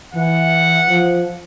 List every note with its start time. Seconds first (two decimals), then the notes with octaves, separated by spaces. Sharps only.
0.14 E3 F#5
0.88 F3